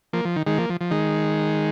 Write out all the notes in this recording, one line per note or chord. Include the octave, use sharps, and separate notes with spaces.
F3 A#3
F3
D#3
D#3 G#3
F3 A#3
F3
F3
D#3 G#3